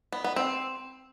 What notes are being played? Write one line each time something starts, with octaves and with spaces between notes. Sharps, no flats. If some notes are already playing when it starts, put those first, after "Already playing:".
B3
B3
C4